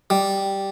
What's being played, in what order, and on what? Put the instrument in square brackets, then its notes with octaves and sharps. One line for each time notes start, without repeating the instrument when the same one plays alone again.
[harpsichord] G3